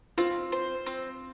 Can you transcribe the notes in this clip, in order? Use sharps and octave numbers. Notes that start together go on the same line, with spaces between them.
C4 F4
C5
C4